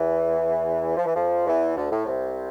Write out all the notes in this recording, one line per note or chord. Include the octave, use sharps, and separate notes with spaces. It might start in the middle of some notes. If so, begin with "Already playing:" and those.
Already playing: E2 E3
F3
E3
F2 F3
E2 E3
D2 D3
A2
C2 C3